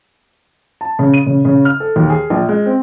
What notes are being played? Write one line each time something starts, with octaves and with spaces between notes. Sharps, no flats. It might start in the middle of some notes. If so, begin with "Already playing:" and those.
A5
C#3
D#7
C#3
C#3
F6
A4
D#2
G#4
A#1
G#3
C4